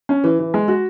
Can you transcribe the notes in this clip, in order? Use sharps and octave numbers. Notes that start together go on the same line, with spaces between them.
C#4
E3
E3
G#3
F#4